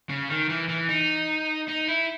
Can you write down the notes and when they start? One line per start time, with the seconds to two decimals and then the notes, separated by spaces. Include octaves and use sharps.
0.09 C#3
0.30 D#3
0.49 E3
0.68 E3
0.89 D#4
1.68 D#4
1.88 E4